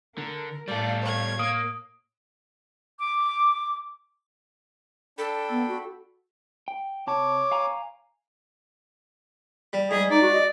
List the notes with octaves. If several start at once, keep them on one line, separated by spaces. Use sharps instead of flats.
D3 A#4
A2 G3 A4 D5 F5
C#5 G#6
A#3 D#6 D7
D6
D4 A4 G5 B5
B3
F#4
G5
C3 C#5 A5 D6
F5 G#5 A#5
G3
G#2 G3 G#4
D#4 D5
F#4
D#5